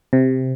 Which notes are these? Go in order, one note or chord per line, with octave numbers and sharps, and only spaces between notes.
C3